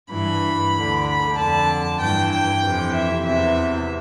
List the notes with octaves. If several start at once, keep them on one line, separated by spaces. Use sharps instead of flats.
G2 E3 B5
D2 D3
B5
F2 D3 A5
G2 E3 G5
G5
F2 C3 E3
E5
E2 C3 E3 E5